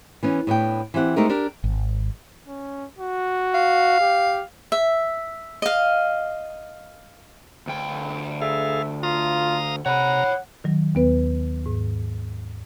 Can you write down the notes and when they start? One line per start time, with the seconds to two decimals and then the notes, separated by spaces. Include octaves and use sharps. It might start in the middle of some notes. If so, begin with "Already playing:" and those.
0.23 E3 B3 C#4
0.47 A2 B3 D4 G5
0.94 E3 C4 G4 F#5
1.16 G#3 A3 C4 D#4 G4 A#4
1.30 D4 G4 A#4
1.64 G#1
2.47 C#4
2.99 F#4
3.54 F5
4.01 G4
4.72 E5
5.62 D#5 F5
7.67 D2 G5
8.42 G#4 A4 E5 F5
9.03 F4 F5 A#5 D#6
9.86 C3 C#5 F#5 A#5 B5
10.64 D#3 F#3
10.95 D#2 B3 B4
11.66 G#2